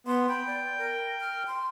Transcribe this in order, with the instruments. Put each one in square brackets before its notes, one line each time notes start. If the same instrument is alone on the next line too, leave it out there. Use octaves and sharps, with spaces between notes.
[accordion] B3 [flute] C6
[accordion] G5 [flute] B5
[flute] D5
A#4
F6
C6